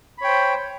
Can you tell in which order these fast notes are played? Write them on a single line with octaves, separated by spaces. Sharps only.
B5 C#5 G5 C5